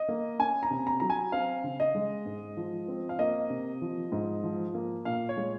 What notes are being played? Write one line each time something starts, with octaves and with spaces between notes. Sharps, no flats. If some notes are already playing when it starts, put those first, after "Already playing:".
Already playing: D#5
A#3
C#4 G#5
A#5
C3
A#5
F#3 A#5
G#5
C4 F5
C#3
D#5
G#3
G#2
F3
C4
F5
A#3 D#5
C3
F3
G#2
F3
A#3
A#2 F5
C#5
G#3